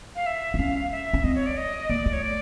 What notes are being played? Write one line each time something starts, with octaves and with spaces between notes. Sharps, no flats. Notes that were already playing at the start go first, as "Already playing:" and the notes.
F5
E5
D4
C#4 F5
E5
C#4
C4 D#5
C#5
D5
D#5
A#3 D5
A3
C#5
D5